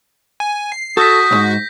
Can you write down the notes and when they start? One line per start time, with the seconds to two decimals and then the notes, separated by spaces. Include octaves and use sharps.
0.40 G#5
0.72 C7
0.97 F#4 A4 D#6 G6 A#6 B6
1.31 B1 G#2